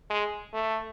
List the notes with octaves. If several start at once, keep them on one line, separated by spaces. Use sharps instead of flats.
G#3
A3